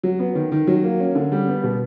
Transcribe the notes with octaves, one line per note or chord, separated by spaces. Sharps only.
F#3
B3
D#3
D#3
F#3
A#3
C#4
D3
G3
B3
B2